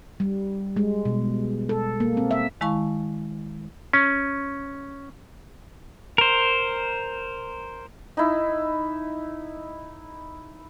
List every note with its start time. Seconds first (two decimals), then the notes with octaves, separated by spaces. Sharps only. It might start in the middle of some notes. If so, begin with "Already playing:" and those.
0.20 G3
0.76 G#3
1.05 B2
1.69 A4
2.00 A#3
2.17 C4
2.31 E5
2.61 D#3 G#3 E4 F5 A5 C#6
3.93 C#4
6.18 A#4 C5
8.17 D#4 E4